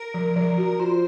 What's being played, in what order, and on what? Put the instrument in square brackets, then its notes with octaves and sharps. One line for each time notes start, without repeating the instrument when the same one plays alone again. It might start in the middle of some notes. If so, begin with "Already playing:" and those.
Already playing: [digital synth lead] A#4
[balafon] F3
F3
F#4
[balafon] F4 [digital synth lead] C5